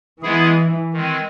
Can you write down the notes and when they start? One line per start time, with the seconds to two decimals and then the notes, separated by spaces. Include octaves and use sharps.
0.22 E3 G#3 B3 E4 G#4
0.93 D#3 G#3 C4